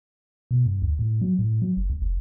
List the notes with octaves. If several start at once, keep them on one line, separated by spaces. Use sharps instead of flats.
B2
G2
D2
A2
F#3
A2
F#3
F1
C#2
F1